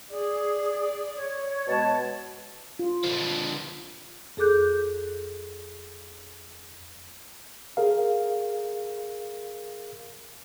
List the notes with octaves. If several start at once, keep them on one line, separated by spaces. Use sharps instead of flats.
G#4 D5
C#5
B2 G#3 A5
F4
D3 F3
F2 G#4 A4 D6 F#6 G6
G#4 A#4 F5